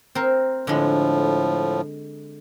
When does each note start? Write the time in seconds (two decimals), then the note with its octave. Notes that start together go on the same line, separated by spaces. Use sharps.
0.15 C4 A#4
0.67 A2 D3 F3 G#3